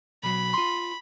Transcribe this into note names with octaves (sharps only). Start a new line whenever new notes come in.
B1 F#3 B5
F4 C6